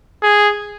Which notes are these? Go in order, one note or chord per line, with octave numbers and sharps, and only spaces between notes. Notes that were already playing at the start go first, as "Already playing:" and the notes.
G#4